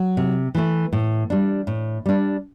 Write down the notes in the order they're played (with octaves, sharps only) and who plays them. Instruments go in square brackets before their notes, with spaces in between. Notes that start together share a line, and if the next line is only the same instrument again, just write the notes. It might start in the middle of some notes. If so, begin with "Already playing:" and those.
Already playing: [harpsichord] F#3
[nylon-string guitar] C3
E3 A3 E4
A2
G3 D4
A2
G3 D4